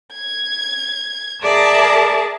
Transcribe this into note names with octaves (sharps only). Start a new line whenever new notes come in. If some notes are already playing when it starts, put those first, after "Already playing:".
G#6
G#4 A#4 D5 E5 A5